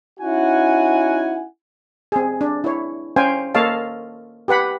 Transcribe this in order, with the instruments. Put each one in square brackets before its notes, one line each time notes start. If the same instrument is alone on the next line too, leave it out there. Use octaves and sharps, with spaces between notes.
[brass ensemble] C#4 D#4 E4 F#4 F#5 G#5
[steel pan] C4 G#4
D4
E4 C#5
C#4 C5 F5 G5 G#5
A#3 A4 C#5 D#5 F5 A5
G4 B4 F#5 B5